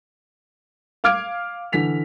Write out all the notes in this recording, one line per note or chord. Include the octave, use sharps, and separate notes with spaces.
F5 D6 F6 G#6 D7
D3 E3 B6 F7